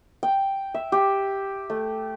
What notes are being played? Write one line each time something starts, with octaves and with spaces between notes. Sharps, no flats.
G5
E5
G4
A3